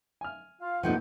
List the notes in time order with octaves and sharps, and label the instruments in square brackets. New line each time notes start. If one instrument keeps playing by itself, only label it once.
[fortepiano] G#5 F6
[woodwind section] F4 F5
[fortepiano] C2 G2 A#2 [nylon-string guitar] F3 A3 D#4 [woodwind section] F#5 G5